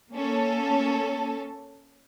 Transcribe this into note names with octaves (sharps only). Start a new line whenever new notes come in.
A#3 C#4 A4